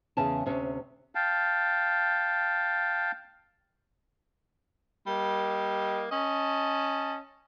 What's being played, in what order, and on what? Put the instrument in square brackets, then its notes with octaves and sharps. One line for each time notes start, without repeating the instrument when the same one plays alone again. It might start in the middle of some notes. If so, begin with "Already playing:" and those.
[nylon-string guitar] E2 C#3 C#4 A5
D2 C3 C#4
[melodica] F5 G5 A5
[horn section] G3 A#3 D#5
C#4 D#5 A5